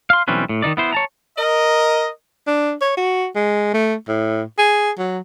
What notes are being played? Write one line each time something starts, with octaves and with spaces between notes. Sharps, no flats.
F5 C6
B1 E3 G3 C4 C#4 B4
A2
D#3 E3 D#4 D5
B3 E4 C5
C#5 A5 A#5
A#4 D#5
D4
C#5
F#4
G#3
A3
A2
G#4
F#3